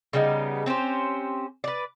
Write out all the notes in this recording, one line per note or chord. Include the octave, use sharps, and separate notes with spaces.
C#3 G3 B3 D#4
C4 C#4 G4 C5
B4 D5